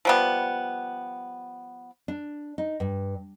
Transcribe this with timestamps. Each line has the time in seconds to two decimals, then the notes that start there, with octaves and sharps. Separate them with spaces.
0.05 F3 G3 B3
2.08 D4
2.58 D#4
2.80 G2